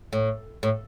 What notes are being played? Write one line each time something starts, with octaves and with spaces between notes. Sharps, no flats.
A2
A2